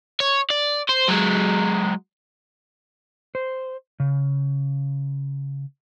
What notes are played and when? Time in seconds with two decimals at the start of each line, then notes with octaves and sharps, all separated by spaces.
0.20 C#5
0.50 D5
0.89 C5
1.08 F#3 G#3
3.35 C5
4.00 C#3